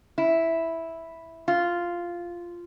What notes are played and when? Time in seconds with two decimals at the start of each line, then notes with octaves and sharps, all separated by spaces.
0.18 E4
1.48 F4